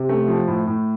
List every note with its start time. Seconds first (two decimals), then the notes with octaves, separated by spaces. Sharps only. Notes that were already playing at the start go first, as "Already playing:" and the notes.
Already playing: C3
0.09 A3
0.28 F3
0.48 A2
0.67 A2